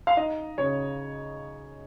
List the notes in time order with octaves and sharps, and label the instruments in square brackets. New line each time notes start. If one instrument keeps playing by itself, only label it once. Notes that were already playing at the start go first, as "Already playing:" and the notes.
[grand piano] F5
D#4 D#5
C#3 C#5